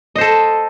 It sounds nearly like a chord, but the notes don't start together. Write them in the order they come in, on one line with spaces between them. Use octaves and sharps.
D#5 C5 A4